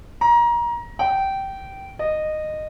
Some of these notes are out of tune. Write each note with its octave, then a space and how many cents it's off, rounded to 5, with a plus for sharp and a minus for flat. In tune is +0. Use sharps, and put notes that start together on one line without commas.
A#5 +25
G5 -15
D#5 -15